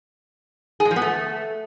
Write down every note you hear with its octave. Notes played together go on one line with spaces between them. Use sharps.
G#4
G#3
F3
B3
A3